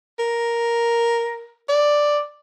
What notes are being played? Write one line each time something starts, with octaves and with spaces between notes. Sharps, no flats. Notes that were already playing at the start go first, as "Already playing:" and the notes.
A#4
D5